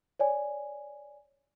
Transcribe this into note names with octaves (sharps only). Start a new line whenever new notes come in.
C#5 D5 G#5